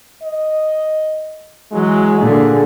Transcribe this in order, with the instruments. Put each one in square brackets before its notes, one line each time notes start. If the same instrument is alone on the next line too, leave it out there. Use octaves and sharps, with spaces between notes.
[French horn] D#5
[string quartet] E3 F#3 [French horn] G#3
[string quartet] A#2 D3 [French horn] G#4